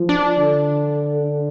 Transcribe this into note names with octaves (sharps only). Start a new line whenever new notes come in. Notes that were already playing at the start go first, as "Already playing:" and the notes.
Already playing: F3
D4
D3